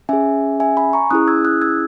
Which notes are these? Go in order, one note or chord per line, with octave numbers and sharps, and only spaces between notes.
C#4 G#4 E5 G#5
E5 G#5
G#5 B5
A#5 C#6
C#4 E4 G#4 D#6 F#6
E6 G#6
D#6 F#6
E6 G#6